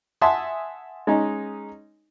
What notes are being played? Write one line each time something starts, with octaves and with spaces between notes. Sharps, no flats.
E5 F#5 G#5 A5 C6 D#6
G#3 C#4 D#4